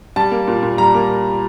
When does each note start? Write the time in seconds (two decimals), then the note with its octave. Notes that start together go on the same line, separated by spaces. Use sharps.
0.16 G3 A5
0.31 A#3
0.47 A#2
0.63 A#2
0.78 G3 A#5
0.94 A#3